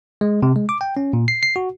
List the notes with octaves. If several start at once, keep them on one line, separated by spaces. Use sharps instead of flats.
G#3
C3
G#3
D6
G5
C#4
A#2
C7
C7
F#4